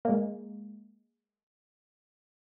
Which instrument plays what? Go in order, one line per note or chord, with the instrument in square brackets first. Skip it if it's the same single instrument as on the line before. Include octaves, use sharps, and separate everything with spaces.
[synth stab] G#3 A#3